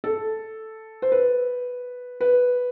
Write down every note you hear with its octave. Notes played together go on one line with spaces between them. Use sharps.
A4
C5
B4
B4